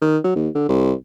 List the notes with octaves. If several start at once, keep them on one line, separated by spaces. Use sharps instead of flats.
D#3
F#3
D#2
D3
C2